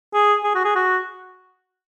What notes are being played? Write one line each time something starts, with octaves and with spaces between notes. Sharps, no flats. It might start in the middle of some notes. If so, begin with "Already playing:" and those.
G#4
G#4
F#4
G#4
F#4